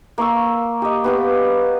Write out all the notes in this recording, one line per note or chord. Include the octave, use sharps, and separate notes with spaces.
A#3 C#6 E6
G4 D#5
B3 G4 F5